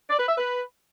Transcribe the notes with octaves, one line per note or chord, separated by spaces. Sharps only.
D5
B4
E5
B4